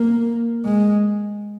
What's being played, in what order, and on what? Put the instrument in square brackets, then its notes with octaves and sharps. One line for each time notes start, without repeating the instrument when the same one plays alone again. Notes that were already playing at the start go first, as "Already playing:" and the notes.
Already playing: [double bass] A#3
G#3